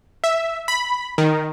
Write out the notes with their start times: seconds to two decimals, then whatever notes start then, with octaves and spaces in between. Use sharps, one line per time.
0.24 E5
0.68 B5
1.18 D#3